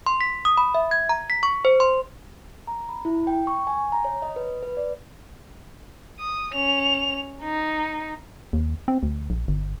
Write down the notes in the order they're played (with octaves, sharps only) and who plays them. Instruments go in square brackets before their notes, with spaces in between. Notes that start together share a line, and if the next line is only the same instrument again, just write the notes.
[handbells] C6
B6
D#6
B5
E5
G#6
A#5
B6
C#6
C5
C6
[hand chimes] A#5
B5
E4
G5
C#6
G#5
A#5
C#5
D#5
B4
B4
D5
[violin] D#6
C#4 F7
D#4
[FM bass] D#2
C4
D2
A#1
G1